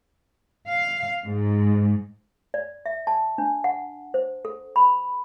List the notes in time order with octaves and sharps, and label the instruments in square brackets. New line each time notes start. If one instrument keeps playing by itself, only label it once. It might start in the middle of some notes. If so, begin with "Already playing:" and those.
[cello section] F5
G#2
[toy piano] D5
E5
A5
D4
F#5
C5
A4
B5